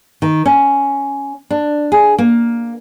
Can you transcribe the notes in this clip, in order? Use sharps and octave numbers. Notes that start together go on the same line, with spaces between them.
D#3
C#4
D4
G#4
A#3